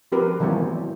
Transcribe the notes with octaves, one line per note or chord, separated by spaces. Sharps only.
F3 C4 G4 A#4 B4
D#3 E3 F#3 A3 B3 C4